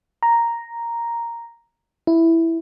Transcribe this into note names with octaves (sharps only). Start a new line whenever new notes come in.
A#5
E4